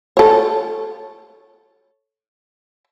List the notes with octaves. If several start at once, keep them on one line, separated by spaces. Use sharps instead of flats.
A4 C#5